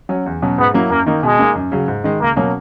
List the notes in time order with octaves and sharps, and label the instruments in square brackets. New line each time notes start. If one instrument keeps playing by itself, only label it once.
[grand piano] F#3 C#4
E2
B2 F#3 C#4
[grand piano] G#2 [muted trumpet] B3
[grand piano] F#3 A#3 E4
[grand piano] F#2 [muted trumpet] A#3
[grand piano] D#3 A#3 D#4
[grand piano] B2 [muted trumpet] G#3
[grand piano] A#3 D#4
F#2
C#3 F#3
G#2
D#3 G#3
[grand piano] C#2 [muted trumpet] A#3
[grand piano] B2 F#3 A#3 C#4